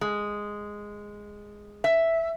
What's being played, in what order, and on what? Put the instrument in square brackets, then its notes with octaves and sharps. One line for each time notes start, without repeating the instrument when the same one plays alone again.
[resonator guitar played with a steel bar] G#3
E5